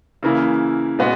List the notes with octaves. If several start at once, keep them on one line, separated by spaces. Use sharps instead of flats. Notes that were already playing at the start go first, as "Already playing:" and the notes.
C#3 E3 A#3 E4
A#2 G#3 B3 F#4